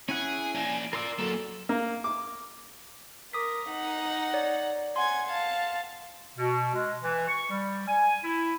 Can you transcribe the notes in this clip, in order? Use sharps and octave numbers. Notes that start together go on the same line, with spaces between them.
C#4 E4 G#4 F#5 G#5
A#3 D4
F4 A#4 D5 C6 E6
F#3 A#3 A4
A#3
D6
A#4 D6 D#6 B6
D#4 F#5
C#5 D5
F#5 G#5 C6 G#6
F5 A5
B2
G#3
E3
C#6
G3
G#5
E4